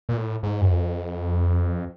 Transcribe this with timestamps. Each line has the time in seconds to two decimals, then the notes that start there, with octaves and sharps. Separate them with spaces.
0.09 A#2
0.17 A2
0.43 G#2
0.61 F#2
0.71 F2